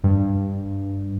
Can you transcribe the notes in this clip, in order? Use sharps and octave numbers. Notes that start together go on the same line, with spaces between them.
G2